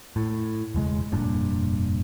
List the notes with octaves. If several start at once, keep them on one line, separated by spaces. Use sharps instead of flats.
A2
E1 C#3 G#3
F1 G2 A#2 D4